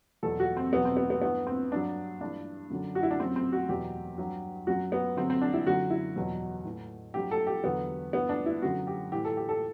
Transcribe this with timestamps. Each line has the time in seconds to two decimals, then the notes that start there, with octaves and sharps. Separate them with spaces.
0.23 E2 B2 F#3 A4
0.40 F#4
0.57 C4
0.72 E2 B2 F#3 B3
0.85 C4
0.97 B3
1.10 B3
1.22 G2 E3 B3
1.47 C4
1.72 G2 F#3 D4
2.21 G2 E3 D4
2.70 F#2 D3 F#3
2.95 F#4
3.03 E4
3.11 D4
3.20 F#2 F#3 C4
3.36 C4
3.52 F#4
3.69 E2 B2 F#3 G4
4.18 G2 F#3
4.67 F#2 F#3 F#4
4.92 B3
5.16 G2 D3 F#3 C4
5.30 C4
5.41 D4
5.54 E4
5.66 F#2 D3 F#3 F#4
5.90 E4
6.16 E2 B2 F#3
6.64 A2 E3
7.14 G2 F#3 G4
7.31 A4
7.47 G4
7.64 E2 D3 F#3 B3
8.13 G2 E3 B3
8.29 D4
8.46 E4
8.62 F#2 D3 F#3 F#4
8.87 G4
9.12 A2 E3 G4
9.25 A4
9.37 G4
9.49 A4